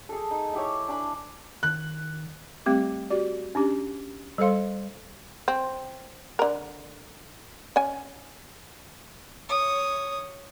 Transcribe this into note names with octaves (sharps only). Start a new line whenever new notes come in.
G#4 A4
D#4
E4 G4 C#5
D4 G#5 B5
D#3 F#6
G3 A3 C4 G4 D6
F#4 G4 D5
C#4 D4 G4
G3 A4 C5 F5 C6
C4
D3 A#4
C#4 G#5
C#5 D#6